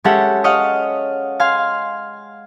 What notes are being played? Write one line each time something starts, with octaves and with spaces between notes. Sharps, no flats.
G#3 C#4 G4 A4 E5 F#5
C#5 D#5 F5 F#5
F5 G#5 C6